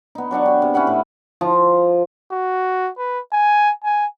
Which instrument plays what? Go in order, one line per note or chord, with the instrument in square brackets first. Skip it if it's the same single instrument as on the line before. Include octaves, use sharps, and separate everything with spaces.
[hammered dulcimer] B3 D#4
F#3 D4 F#5 C#6
G4
C3
C#4 E4 F#5 B5
A2
F3
[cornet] F#4
B4
G#5
G#5